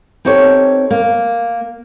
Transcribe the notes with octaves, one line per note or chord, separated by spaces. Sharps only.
C4 D#4 G4 A4 C#5
A#3